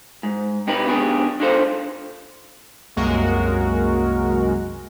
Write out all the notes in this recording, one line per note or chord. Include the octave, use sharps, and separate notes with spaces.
G#2
C3 D#4 G4 B4
D#3 B3 D4 G4 G#4
D4 D#4 F4 A4 C5
C2 F#2 G#3 A#3 F#4 A#4